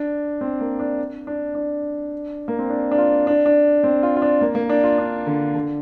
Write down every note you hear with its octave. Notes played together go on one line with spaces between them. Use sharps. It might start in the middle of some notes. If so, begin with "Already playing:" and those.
Already playing: D4
C4
A#3
D4
D4
D4
A#3
C4
D4
D4
F4
D4
D4
C4
F4
F4
D4
A#3
A#3
D4
F4
D4
D3
D3